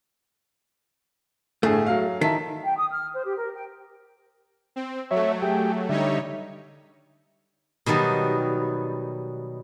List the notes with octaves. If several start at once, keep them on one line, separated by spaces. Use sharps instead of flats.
G1 A2 A3 G#4
F#3 F5
D#3 E4 A5 B6
G5
D#6
F6
C5
G4
A#4
G5
C4
F#3 A3 C#5 E5
G4 G#4 G5
D3 G3 D#4 C#5 E5
B2 D#3 F#3 G3